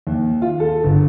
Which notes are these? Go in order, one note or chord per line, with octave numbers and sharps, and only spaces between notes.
D#2
F4
A4
G1